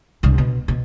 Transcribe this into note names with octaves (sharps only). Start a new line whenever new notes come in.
C2 G2
B2
B2